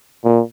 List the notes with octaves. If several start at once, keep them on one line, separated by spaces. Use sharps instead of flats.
A#2